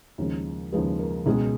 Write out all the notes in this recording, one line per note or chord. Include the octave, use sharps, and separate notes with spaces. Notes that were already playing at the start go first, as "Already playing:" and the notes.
D#2 C#3 F3 G#3
D#2 C#3 F3 G#3 B4
A#4
C#2 B2 G#3 G#4